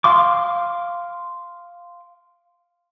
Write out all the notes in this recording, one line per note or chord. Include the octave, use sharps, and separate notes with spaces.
F5 C6 D6